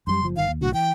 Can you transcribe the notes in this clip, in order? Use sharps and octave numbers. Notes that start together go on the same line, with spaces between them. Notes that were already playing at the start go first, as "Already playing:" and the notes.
F#2 F#3 G3 C6
F#1 F3
G1 D#3 F5
D#2
B1 A2 D3 F#4
E3 G5